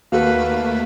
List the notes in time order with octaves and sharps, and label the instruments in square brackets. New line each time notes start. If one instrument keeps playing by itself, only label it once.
[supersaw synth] D#2 A3 A#3 [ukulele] F#4 A4 [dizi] B4 [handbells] F5